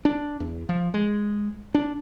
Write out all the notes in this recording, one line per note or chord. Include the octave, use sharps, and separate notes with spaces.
D4
E2
F3
G#3
D4